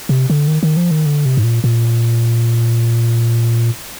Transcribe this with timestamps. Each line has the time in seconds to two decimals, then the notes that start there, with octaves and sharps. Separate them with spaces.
0.09 C3
0.30 D3
0.48 D#3
0.63 D#3
0.77 F3
0.91 D#3
1.06 D3
1.25 C3
1.37 G#2
1.44 A#2
1.64 A#2